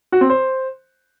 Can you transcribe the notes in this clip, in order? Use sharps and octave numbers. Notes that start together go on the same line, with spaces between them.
F#4
C4
C5